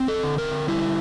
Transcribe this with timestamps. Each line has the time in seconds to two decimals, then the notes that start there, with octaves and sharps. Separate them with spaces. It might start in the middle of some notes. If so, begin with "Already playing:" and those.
Already playing: C4
0.08 A4
0.23 D3
0.38 A#4
0.68 G3 E4